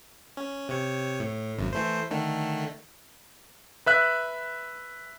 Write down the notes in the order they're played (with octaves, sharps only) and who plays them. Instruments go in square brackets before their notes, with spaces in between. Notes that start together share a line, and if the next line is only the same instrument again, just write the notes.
[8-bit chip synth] C#4
C3 C#5
A2
G#1 F#2
E3 A3 C5
D3 D#3 A3
[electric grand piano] B4 E5 F#6